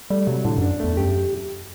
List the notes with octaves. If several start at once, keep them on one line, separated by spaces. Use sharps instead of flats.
G3 A3
C3 F#3
A2 D3
F#2 D4
E2 A3
F#2 G4